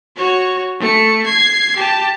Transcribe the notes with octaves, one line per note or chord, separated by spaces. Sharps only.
F#4 C#5
A3 C#7
G#6 C7
G4 A5